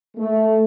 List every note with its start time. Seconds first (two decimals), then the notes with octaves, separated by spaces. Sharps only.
0.17 A3